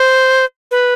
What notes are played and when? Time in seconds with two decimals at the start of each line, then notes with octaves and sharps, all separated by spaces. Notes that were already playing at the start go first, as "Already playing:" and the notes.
Already playing: C5
0.71 B4